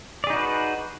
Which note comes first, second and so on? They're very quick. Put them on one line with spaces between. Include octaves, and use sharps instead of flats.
D5 G#4 D#4 F#4 B4